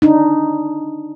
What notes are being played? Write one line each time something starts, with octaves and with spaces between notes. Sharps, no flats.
D4 D#4